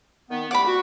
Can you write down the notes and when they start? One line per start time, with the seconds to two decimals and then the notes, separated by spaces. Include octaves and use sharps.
0.31 D#3 B3
0.51 C2 A3 F#5 B5 D6
0.66 F#4